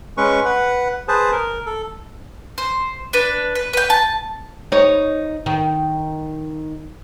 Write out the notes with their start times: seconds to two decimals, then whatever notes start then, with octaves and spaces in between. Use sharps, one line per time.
0.18 G#3 C#4 B4 C#6
0.45 B4 F#5
1.08 G#4 B4 C5 A5
1.32 A#4
1.66 A4
2.58 C5
3.13 D4 B4
3.55 B4
3.73 B4 G5
3.90 A5
4.72 D#4 C#5
5.46 D#3